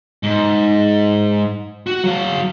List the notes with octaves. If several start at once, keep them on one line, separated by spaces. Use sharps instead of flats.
G#2
F#4
F#3 F5